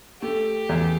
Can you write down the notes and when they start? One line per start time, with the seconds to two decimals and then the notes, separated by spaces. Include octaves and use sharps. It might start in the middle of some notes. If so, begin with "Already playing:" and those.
0.21 A3 G4
0.69 E2